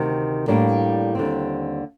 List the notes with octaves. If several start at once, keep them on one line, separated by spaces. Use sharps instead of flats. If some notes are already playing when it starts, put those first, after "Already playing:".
Already playing: D2 C3 D#3
A2 G3 A#3 D4
D#2 D3 G3 C4